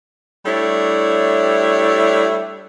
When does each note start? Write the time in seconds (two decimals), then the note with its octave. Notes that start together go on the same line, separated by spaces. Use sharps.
0.46 G3 A3 D4 E4 C#5